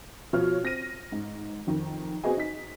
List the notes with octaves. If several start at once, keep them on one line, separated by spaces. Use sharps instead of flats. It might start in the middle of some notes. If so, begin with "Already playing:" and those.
B2 F3 F4 C#5 F6
C4 A#6 D#7
G#2
F2 D#3
B3 C4 F#4 G#4 D#5 G#5
D#4 B6